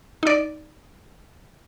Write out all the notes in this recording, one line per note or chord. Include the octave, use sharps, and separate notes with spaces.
D#4 D5